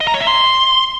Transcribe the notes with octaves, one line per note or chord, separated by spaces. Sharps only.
D#5
A#5
C#5
E5
C6